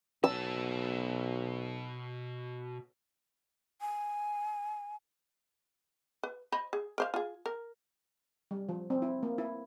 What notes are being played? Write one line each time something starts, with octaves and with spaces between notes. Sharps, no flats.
B1 B2 A5 E6
G#5
B4
C5 D#5 B5
G#4
A#4 C5 F5
F4 G#4
A#4
G3
F3
C4
E4
A#3
E4